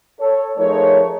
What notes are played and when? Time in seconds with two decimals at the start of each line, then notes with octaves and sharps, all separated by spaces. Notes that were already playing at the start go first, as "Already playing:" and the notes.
0.19 A4 C#5
0.58 F3 A3 D#4 G#4 A#4 C#5